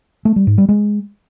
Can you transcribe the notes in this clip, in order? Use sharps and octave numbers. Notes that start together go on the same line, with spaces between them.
A3
G3
G#2
G3
G#3